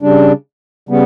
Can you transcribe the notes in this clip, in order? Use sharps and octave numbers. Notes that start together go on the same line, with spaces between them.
C#3 G3 D4
C#3 G3 B3